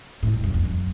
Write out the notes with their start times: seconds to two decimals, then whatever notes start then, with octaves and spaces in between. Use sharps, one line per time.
0.23 A2
0.33 G2
0.44 F#2
0.54 F2
0.65 F#2